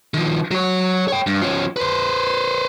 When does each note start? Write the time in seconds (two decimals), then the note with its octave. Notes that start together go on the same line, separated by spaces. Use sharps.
0.14 D#3 F3
0.51 F#3 C#5
1.08 C#5 G5
1.27 G2
1.41 F3 C#4
1.76 B4 C5